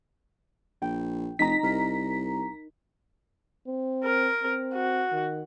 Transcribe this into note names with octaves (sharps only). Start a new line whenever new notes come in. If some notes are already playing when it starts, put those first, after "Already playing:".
A#1 G5
F1 D#4 A#5 B6
C2 A#4
C4
A#4
C4
F#4
D#3